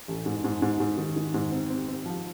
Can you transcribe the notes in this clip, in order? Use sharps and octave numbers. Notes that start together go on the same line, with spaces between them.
A1
G#2
G#2
G#2
G#2
D#3
D#3
G#2
C4
C4
C4
F3